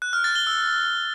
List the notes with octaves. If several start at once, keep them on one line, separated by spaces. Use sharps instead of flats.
F#6
F6
A6
G7
E6